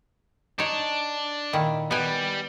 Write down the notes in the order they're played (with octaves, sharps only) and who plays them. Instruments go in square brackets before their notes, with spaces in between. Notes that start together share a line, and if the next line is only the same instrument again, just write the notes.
[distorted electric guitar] D4 [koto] D#4 C#5
[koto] A#2 D#3 E4
[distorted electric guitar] G3 [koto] B3 G#5